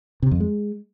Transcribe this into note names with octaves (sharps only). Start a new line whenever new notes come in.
C3
F2
G#3